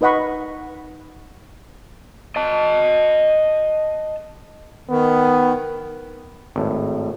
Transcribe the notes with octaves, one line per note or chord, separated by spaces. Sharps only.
D#4 B4 D#5 F#5 B5 C#6
D#5 A5
D#3 B3
G#1 A2